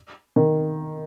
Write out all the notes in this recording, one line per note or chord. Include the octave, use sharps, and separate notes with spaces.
D#3